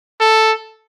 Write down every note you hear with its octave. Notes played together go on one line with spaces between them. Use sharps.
A4